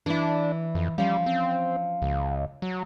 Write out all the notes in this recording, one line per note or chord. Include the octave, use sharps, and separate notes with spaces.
E3 D4 E4
F2
F3 G3 C#4 F5
C4
C#2
F#3